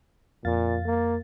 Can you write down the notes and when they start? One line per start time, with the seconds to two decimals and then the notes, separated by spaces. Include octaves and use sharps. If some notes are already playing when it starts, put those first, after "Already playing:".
0.45 F2 A#2 F5 A6
0.86 A#3